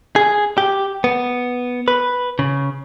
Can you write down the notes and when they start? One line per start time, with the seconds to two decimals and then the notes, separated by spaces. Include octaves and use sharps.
0.16 G#4
0.58 G4
1.04 B3
1.88 B4
2.39 C#3